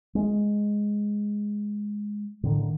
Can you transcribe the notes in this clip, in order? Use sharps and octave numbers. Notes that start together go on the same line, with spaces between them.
G#3
A2 D3 D#3